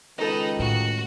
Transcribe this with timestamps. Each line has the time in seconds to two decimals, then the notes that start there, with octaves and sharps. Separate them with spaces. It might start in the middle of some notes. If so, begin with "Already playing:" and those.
0.18 C#2 D#3 D#4 A4 B4 D#5
0.59 A2 F#4